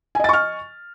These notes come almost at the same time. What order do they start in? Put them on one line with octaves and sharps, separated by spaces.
G#5 D#5 A6 C#6 F6